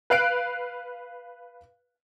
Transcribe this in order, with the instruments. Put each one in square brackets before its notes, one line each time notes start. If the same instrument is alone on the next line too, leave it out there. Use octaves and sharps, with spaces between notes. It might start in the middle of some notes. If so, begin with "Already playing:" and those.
[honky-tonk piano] B4 F5 F#6 D7